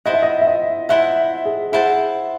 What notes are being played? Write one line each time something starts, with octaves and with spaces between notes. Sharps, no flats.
E4 C5 D#5 F#5 A5
E5
D#5
E5
D#5
E4 C5 E5 F#5 A5
G#4
E4 G#4 C5 F#5 A5